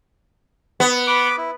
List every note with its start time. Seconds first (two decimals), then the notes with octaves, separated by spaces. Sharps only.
0.80 B3
1.07 B4 D6
1.38 E4